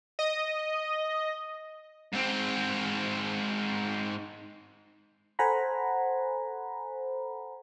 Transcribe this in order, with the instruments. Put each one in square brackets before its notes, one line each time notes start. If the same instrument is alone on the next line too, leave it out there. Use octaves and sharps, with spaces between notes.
[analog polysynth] D#5
[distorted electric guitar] G#2 C4
[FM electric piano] A4 C5 F#5 G#5 A#5 B5